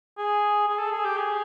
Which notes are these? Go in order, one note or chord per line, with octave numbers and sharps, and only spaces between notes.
G#4
G#4
A4
G#4
G4
G#4